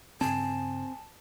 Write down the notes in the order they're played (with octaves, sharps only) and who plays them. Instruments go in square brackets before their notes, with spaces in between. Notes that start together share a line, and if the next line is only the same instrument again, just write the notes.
[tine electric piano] G2 C#3 [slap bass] C4 [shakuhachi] G#5 [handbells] A5